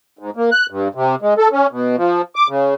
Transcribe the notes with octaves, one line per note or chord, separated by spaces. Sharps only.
G#2
A#3
F#6
G2
C3
G#3
A4
C#4
B2
F3
D6
C#3